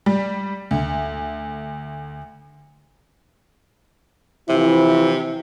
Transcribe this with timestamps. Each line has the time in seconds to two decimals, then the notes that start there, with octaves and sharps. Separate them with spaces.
0.06 G3
0.71 D2
4.49 C3 E3 F3 E4